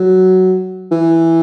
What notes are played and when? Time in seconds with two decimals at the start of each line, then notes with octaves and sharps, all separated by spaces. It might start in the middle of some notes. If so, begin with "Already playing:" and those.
Already playing: F#3
0.91 E3